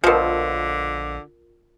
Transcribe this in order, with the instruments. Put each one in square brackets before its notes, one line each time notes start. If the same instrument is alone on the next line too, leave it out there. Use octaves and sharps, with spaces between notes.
[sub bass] A#1 [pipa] B2 F3 [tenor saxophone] D3 [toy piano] F4 A#4